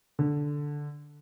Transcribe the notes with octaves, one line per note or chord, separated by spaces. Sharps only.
D3